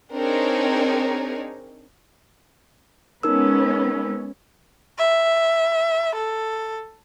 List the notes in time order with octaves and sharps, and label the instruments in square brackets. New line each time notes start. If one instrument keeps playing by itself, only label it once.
[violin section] C4 D4 D#4 G#4 A#4 C#5
[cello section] G#3 B3 C#4 [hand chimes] D#4 A#4 E6
[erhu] E5
A4